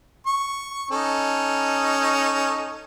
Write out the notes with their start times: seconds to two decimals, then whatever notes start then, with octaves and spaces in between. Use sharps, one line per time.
0.26 C#6
0.91 C#4 D#4 A4